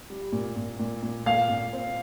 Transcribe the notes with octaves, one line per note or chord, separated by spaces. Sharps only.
G3
A#2
A#2
A#2
A#2
A#2 F5
A#2
C4